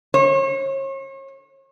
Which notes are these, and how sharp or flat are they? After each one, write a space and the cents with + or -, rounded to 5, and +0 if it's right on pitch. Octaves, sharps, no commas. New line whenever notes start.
C#5 -40